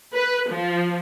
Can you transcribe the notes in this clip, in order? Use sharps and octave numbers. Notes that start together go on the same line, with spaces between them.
B4
F3